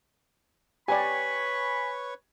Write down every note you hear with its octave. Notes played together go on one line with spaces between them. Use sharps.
G4 B4 C#5 D5 G#5 B5 C#6